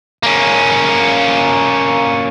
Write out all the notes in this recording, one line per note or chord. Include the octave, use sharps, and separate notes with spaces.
A#3 C#4